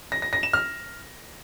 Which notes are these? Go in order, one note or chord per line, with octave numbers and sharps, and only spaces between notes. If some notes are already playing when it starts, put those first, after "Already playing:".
A#6
A#6
A#6
E7
F6